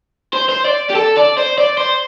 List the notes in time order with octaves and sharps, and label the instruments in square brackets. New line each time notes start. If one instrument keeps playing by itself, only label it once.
[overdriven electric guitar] C5
C5
D5
G4
A4
D5
C5
D5
C5